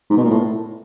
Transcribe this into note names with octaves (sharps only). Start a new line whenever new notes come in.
G#2
B2
A#2
A2